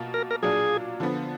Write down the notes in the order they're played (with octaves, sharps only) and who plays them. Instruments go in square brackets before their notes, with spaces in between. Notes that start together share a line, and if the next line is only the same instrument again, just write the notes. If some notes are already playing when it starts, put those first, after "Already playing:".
Already playing: [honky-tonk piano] B2 A#3 F4
[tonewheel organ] A#4
A#4
[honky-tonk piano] A#2 F#3 D4 F4 [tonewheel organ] G#4
[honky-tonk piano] D3 F3 B3